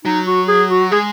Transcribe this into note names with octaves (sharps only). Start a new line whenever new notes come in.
F#3 D#4
F#4
G#4
F#4
G#3 G#4